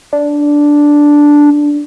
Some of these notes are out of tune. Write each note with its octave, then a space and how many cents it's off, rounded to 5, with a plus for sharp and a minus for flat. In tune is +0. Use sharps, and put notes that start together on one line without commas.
D4 -5